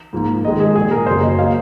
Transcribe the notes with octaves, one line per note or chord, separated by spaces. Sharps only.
G#2 F3 A#3
G#2 D#3 G#3 D#5
G#4
A#2 F3 G#3 G#4
A#4
F#2 C#3 F#3 A#3 C5
D#5
F#3 A#3 F5